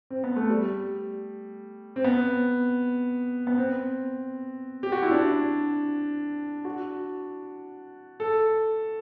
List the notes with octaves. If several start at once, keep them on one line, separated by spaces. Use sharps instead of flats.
C4
B3
A3
G3
C4
B3
B3
C4
G4
F#4
E4
D4
F#4
A4